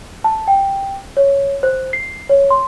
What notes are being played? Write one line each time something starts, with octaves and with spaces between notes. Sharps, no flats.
A5
G5
C#5
C5
C7
C#5
C6